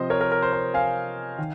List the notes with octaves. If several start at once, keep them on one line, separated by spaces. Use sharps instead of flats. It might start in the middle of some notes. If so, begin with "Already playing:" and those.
Already playing: C3 F3 C4 C5 D#5
A#4 C#5
A#4
A#4
C5
C5
F5 G#5
D#3